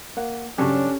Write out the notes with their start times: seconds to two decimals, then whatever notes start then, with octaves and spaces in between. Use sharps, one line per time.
0.17 A#3 F#5
0.58 G2 C#3 F#3 C#4 D4 G4 A4 C#5